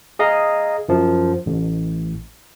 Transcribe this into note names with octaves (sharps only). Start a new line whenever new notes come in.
G#4 D#5 F5 A#5
F#2 F3
A1